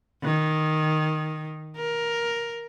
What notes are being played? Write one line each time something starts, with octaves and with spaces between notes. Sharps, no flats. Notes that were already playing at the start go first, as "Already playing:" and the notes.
D#3
A#4